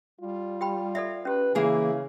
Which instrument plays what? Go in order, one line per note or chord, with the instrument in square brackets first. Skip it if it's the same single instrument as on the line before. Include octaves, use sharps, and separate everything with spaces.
[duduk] G3 [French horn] F4
[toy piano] G4 G5 B5
[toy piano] A4 D5 E5 [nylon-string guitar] F5
[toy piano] C#4 G4 [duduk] B4
[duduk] C#3 [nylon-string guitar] E3 A#3 G#4 [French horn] E4 [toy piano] G#5